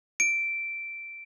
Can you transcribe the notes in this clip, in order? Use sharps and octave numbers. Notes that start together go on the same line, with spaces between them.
D7